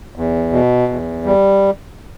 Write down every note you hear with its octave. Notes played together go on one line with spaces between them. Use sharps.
E2
B2
E2
G3